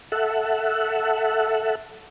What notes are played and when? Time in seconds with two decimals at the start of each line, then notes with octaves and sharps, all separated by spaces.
0.12 A4 E5 F#5